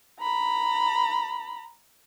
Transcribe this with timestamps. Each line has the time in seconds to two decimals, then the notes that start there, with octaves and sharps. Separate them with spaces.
0.20 A#5 B5